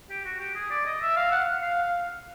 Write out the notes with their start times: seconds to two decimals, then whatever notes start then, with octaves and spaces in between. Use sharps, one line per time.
0.10 G4
0.25 F#4
0.40 G4
0.55 G#4
0.70 D5
0.86 D#5
1.01 E5
1.16 F5
1.31 F#5
1.62 F5